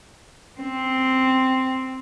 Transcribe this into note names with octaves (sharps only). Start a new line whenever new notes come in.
C4